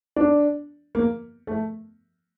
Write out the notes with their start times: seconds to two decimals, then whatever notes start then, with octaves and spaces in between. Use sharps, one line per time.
0.16 D4
0.95 A#3
1.47 A3